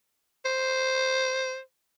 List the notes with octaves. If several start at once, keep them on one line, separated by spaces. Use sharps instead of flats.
C5